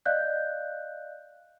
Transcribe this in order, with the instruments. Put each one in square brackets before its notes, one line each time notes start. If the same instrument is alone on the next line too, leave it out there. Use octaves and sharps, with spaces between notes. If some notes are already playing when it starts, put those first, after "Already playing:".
[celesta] D5 D#5 F5 F#6 G6